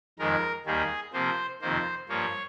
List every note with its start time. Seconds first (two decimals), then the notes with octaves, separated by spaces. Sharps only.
0.19 F2 D#3 G#3 A#4
0.66 D#2 D#3 G3 A#3 G#4
1.13 C3 F3 A#3 C5
1.62 F2 C3 D#3 A#3 C5
2.09 G2 F3 A#3 C#5